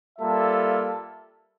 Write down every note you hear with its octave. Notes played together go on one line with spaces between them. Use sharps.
G3 A#3 F4 A4 E5